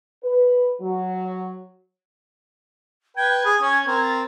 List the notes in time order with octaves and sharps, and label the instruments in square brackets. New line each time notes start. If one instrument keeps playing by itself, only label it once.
[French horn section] B4
F#3
[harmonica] B4 G5 [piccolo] G#6
[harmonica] G#4
C#4
C4 A#4
[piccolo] A6